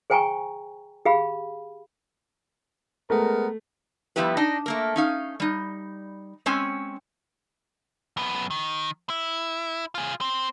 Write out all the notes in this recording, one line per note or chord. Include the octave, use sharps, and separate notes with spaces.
G#4 C5 G5 G#5 A#5 C#6
G4 G#4 F5 B5
G#3 A3 B3 A#4
F3 G3 B3 E4 G4 B4
D4 D#4 D#5
A3 A#3 A#4
C#4 D#4 F5
G3 D#4
G#3 C4 C#4 G#5
F#2 B3
D#3
E4
F4 G#4
C4